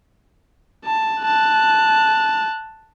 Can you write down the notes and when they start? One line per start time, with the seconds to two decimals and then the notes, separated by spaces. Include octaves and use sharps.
0.85 A5
1.22 A5 F#6